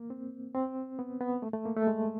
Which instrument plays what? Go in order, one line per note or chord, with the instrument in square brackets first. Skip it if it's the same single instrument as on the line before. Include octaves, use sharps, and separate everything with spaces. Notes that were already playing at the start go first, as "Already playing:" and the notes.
Already playing: [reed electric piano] A#3
C4
C4
B3
B3
A3
A3
A#3
A3
G#3